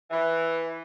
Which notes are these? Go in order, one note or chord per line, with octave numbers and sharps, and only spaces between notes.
E3